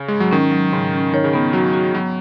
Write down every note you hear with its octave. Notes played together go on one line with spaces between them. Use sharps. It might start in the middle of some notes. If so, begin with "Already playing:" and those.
Already playing: C#3
G#2 G#3
F#3
D#3 C#4
F#3
G#2 C#3
C#4
D#3 C#5
C#3
D#3 B3
F#3 F#4
F#4
F#3 B3